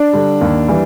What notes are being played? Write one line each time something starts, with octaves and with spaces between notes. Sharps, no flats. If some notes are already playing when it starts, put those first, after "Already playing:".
Already playing: D4
D3 G3
D#2
E3 G3